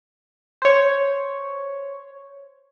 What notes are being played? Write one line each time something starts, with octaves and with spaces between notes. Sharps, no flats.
C5 C#5